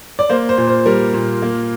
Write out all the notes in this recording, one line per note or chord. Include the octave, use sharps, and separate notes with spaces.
D5
A#3 C5
C5
A#2
C5
G3 A#4
A#2
A#3